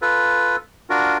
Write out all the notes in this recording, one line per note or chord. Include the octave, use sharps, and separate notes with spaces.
F4 A4 B4
D4 F4 F#4 A#4